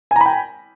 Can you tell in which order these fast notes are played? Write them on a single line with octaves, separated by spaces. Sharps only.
G#5 A#5 B5 G5